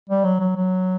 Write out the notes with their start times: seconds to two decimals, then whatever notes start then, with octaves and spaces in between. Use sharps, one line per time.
0.09 G3
0.24 F#3
0.40 F#3
0.56 F#3